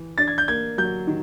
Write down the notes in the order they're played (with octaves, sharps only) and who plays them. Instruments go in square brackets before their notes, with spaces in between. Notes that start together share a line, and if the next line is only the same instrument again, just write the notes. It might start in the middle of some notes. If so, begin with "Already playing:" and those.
Already playing: [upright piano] E3
[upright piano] D4 [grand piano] A6
[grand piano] G#6
G6
[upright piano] A#3 [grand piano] G#6
[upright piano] F#3 [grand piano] G6
[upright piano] D#3